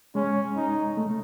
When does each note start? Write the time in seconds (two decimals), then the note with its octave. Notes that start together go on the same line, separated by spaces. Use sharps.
0.15 G#3 C#4
0.56 D#4
0.97 A3